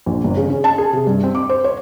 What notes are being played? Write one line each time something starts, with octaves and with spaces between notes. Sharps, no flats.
A#1
G1
C#3
C#4
A5
G#4
C3
G2
C4
D6
C5
C#5